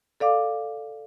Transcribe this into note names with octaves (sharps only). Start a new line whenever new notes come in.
A4 D5 F5 D6